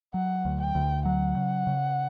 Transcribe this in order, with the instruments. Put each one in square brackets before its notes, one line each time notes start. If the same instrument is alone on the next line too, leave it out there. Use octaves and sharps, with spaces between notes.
[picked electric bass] F#3 [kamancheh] F#5
[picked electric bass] D2
[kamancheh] G5
[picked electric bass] D2
[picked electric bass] F#3 [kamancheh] F#5
[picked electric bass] C#3
C#3